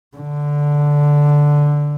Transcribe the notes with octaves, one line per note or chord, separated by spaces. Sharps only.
D3